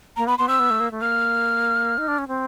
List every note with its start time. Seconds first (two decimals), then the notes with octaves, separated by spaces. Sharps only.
0.17 A#3 A#5
0.27 B3 B5
0.38 B3 C6
0.48 C4 E6
0.59 B3
0.70 A3
0.80 A#3
0.91 A3
1.01 A#3 F6
1.98 D#4
2.08 D4
2.18 C#4
2.28 C4